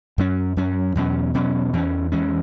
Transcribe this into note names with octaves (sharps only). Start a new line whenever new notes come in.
F#2 F#3 C#4
F#2 F#3 C#4
E2 B2 F#3 C#4
E2 B2 F#3 C#4
E2 E3 G#3 C#4
E2 E3 G#3 C#4